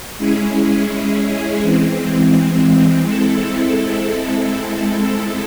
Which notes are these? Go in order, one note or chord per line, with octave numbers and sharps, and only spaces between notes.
G#3 C#4 E4 G#4
E3 G#3 C4
G#3 C4 E4 A4